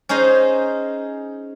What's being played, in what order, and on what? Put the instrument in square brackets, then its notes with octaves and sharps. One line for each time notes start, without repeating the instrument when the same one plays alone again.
[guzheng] C#4 D#4 G#4 C5 D#5